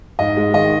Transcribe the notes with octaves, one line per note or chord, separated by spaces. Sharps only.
G#2 D#5
G#3
D#3 D#5